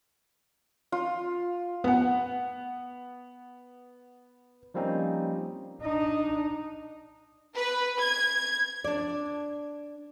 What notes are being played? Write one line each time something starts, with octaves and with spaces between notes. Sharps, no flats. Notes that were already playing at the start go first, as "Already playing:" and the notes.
F4
B3 F#5
F3 G3 A#3 C4 C#4 D#4
D4 D#4
B4
G#6
D4 D5